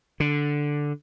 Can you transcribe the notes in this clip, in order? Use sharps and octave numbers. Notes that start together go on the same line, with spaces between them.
D3